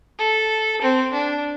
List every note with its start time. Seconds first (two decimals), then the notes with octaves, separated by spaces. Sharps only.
0.18 A4
0.81 C4
1.13 D4